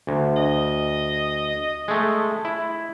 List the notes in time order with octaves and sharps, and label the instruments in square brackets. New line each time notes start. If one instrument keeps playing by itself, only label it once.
[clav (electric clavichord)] D2
[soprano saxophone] D#5
[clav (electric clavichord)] G#3 A3
E4